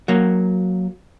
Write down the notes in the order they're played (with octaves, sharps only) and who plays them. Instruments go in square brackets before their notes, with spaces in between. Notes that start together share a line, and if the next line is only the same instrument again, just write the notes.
[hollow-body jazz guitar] F#3 A#3